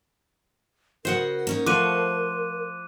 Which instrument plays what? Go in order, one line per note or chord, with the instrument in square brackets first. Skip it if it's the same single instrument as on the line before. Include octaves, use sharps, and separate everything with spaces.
[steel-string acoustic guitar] C#3 F#4 D#5 [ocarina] A#4 [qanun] C5 F#5
[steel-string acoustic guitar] A#3 C#4 D#4
[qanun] F3 A3 F#5 [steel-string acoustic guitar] C5 [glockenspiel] D6 F#6 D#7